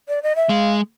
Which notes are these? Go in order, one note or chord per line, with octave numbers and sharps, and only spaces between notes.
D5
D#5
E5
G#3 F5